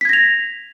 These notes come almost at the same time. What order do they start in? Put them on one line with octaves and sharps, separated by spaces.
B6 G#6 A#6 F7